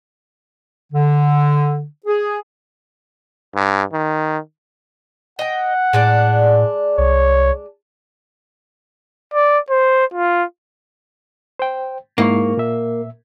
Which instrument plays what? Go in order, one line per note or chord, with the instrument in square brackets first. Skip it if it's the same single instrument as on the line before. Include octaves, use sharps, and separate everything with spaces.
[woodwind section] D3
G#4
[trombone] G2
D#3
[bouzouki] D#5 G5 [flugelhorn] F#5
[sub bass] A2 [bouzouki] G#3 D4 D5
[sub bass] C2 [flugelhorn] C#5
[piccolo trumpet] D5
C5
F4
[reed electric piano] C5 G5
[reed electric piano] G#2 E4 C#6 [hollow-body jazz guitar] A#3
[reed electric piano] A#2 E5